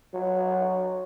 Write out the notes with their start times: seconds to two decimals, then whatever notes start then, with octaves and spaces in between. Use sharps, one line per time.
0.14 F#3